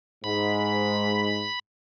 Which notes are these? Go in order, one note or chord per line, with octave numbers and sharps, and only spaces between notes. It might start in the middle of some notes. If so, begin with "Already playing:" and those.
G#2 B5